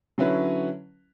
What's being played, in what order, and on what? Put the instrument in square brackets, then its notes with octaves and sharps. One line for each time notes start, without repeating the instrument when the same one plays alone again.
[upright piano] D3 F#3 C#4 E4 B4